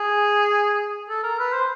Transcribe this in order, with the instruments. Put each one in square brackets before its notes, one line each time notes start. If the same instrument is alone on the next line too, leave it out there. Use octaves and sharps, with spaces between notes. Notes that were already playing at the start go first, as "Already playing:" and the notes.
Already playing: [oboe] G#4
A4
A#4
B4
C5